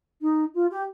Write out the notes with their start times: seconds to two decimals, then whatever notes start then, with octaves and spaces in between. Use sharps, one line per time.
0.21 D#4
0.54 F4
0.71 G4